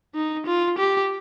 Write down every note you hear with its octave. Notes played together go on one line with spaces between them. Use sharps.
D#4
F4
G4